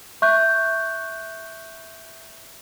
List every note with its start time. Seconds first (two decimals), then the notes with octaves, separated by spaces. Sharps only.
0.22 E5 C#6 F#6 G6